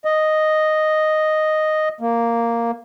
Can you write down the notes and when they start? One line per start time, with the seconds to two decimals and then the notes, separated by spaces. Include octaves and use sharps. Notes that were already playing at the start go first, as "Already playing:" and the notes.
0.05 D#5
2.01 A#3